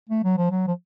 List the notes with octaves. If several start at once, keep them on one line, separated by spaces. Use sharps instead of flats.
A3
F#3
F3
F#3
F3